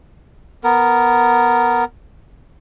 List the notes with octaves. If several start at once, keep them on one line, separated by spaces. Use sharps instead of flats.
B3 A#4